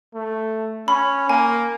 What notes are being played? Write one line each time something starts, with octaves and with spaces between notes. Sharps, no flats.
A3
C#4 B5
A#3 G#5